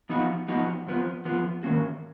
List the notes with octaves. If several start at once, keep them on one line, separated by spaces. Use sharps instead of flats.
F3 B3 D#4 F#4
F3 B3 D#4 F#4
F2 F3 B3
F2 F3 B3
G#2 D#3 A#3 C#4 F#4